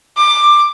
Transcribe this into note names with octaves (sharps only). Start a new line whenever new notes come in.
D6